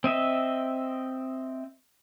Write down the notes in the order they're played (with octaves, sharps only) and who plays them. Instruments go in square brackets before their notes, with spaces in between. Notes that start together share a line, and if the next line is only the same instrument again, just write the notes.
[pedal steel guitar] C4 D#5 E5